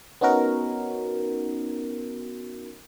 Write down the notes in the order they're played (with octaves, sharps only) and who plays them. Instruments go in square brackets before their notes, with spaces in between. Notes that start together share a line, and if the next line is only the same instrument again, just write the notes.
[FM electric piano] B3 C#4 D#4 F#4 A#4